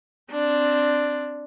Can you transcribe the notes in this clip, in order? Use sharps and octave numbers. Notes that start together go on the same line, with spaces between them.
C4 D4